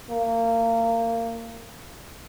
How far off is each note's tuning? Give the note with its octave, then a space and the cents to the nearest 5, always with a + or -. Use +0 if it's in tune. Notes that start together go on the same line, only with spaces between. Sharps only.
A#3 -25